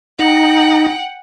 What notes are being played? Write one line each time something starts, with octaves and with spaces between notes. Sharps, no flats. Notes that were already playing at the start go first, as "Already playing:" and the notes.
D#4 F#5 G5